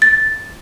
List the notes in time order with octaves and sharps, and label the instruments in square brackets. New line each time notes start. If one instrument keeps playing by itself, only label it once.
[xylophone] A6